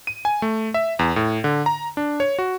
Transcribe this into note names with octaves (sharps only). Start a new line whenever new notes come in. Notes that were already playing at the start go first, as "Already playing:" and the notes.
D#7
G#5
A3
E5
E2
A2
D3
A#5
D4
C#5
F#4